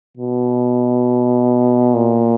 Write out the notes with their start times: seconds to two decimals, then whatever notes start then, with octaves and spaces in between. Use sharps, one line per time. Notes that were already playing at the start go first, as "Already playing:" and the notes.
0.17 B2
1.94 A#2